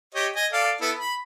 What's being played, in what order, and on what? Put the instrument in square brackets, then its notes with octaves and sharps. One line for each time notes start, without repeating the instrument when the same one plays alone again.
[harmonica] G4 C#5 D#5
D#5 G#5
A4 D5 F5
B3 E4 A4
B5